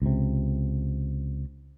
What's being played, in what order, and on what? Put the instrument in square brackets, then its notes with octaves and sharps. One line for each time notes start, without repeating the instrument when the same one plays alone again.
[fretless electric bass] C#2 C3